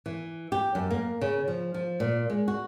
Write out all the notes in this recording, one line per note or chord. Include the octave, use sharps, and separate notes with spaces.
E3
G4
F#2
A#3
C#3
F3
F3
A#2
G#3
F#4